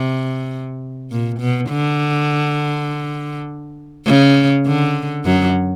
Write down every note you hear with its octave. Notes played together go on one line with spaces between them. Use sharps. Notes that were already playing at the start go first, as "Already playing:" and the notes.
Already playing: C3
A#2
B2
D3
C#3
D3
F#2 F#3